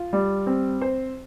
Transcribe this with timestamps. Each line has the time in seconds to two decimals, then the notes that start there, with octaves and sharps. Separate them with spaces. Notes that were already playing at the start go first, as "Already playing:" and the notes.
Already playing: F4
0.13 G3
0.47 C4
0.81 C5